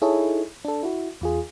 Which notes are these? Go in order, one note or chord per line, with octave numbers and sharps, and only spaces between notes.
D#4 E4 G#4 A4 C#5
D4 A4
E4 F#4
E2 F4 G#4